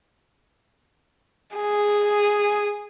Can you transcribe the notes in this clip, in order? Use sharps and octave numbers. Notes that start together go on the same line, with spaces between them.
G#4